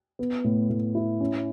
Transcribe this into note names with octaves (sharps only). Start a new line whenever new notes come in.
B3
A2
A2
E4
C#4